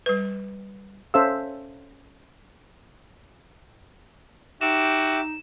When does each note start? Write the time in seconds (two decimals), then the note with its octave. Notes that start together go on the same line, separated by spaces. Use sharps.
0.06 G3 B4
1.14 C#4 A4 C5 E5 F5 E6
4.61 D#4 F#4 G4 E5 D6 E7